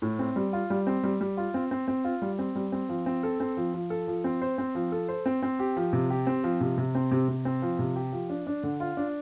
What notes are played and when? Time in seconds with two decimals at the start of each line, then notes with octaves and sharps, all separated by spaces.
0.02 A2
0.19 C4
0.36 G3
0.53 F4
0.70 G3
0.87 C4
1.04 G3
1.21 G3
1.37 F4
1.54 C4
1.71 C4
1.88 C4
2.04 F4
2.22 G3
2.39 C4
2.56 G3
2.72 C4
2.89 F3
3.06 C4
3.23 A4
3.40 C4
3.57 F3
3.74 F3
3.90 A4
4.07 F3
4.24 C4
4.42 C5
4.58 C4
4.75 F3
4.92 A4
5.08 C5
5.26 C4
5.43 C4
5.59 G4
5.76 F3
5.93 C3
6.10 G4
6.27 C4
6.44 F3
6.61 C3
6.78 C3
6.95 C4
7.12 C3
7.28 C3
7.45 C4
7.62 F3
7.79 C3
7.96 G4
8.13 F3
8.30 D4
8.47 D4
8.63 D3
8.80 F4
8.97 D4